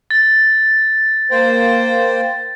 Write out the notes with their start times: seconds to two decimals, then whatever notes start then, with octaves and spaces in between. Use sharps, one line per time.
0.11 A6
1.31 A#3 C5 G5